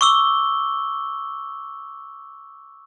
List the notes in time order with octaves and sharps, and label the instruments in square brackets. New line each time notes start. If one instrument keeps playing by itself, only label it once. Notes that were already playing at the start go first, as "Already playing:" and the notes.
[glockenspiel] C#6 D6 E6 G7